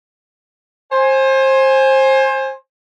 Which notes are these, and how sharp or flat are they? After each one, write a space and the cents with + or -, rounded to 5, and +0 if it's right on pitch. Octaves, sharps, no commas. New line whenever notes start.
C5 +25 G#5 +0